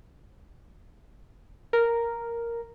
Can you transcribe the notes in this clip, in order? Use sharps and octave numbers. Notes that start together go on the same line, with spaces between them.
A#4